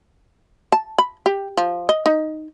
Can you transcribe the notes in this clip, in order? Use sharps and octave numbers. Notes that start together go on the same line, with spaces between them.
A5
B5
G4
F3
D#5
D#4